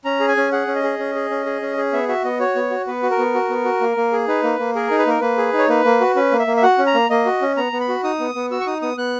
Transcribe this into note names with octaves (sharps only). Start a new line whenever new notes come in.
C#4 A#5
G#4
G#5
C#4
G#4 F#5
C#4
D#5
G#4
C#4
G#4
C#4
G#4
C#4
G#4
B3 E5
F#4 E5
B3 D#5
F#4 C#5
B3
F#4
B3 B4
F#4
A#4
B3
F#4
B3
F#4
A#3
A#3
G#4
D#4 B4
A#3
A#3
G#4 A#4
D#4
B4
A#3 A#4
A#3 B4
G#4
D#4
C#5
A#3 B4
A#3
F#4
C#4 B4
A#3
E5
A#3
E5
F#4 F#5
C#4
A#5
A#3
A#3 D#5
F#4
C#4
B3 A#5
B3
B5
F#4
D#4 D#6
B3
B3
F#4 E6
C#6
D#4 D#6
B3 D#6
B3 F#6